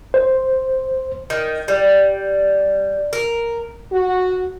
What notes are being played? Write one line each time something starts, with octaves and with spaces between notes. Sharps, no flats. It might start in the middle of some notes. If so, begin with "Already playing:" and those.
C5
D#3
G3
A#4
F#4